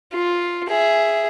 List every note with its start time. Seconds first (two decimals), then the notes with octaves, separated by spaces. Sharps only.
0.13 F4
0.69 G#4 E5